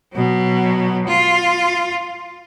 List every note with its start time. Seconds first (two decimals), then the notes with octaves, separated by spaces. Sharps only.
0.14 B2 F#3
1.08 F4